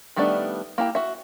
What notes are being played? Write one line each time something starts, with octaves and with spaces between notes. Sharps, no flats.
D#3 G3 A3 B3 D4
A#3 E4 G4
F#4 E5